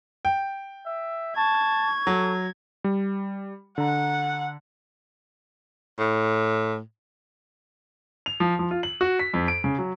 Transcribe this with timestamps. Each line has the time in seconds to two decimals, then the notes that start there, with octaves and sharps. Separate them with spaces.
0.25 G5
0.86 E5
1.37 A5 C#6 G#6
2.07 F#3 A4
2.84 G3
3.78 D3 F#5 A#5
5.99 A2
8.26 F7
8.40 F3
8.59 F3
8.71 F4
8.83 F#7
9.01 F#4
9.19 B6
9.34 F2
9.48 D7
9.64 C#3
9.78 F#3